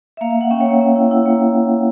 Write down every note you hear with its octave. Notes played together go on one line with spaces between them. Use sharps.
E5
A#3 F5
F5
A#3 F#5
C#4 G5
C#5
A#3
C#4
E4
E4
A#3